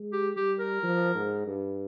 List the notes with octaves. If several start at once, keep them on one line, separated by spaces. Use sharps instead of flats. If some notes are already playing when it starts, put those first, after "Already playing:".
Already playing: G#3
G4
G3 G4
A#4
F3
G#2
G2